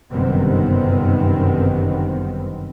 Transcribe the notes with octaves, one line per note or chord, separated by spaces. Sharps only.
G1 F#2 C3 D#3 B3 C4